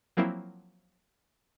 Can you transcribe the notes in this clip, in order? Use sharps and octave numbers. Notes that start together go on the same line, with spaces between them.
F3 F#3 A#3 C4 E4